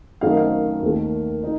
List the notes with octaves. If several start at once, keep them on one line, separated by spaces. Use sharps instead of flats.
F#2 D#3 A3 D#4 F5
D#5
F5
D#2 D#3 A3
D#4